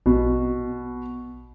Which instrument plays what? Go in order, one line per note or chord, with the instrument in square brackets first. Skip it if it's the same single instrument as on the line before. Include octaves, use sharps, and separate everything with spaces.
[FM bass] A#1 [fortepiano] B2